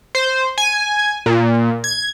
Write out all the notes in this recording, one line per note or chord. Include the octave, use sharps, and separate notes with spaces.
C5
G#5
A#2
G#6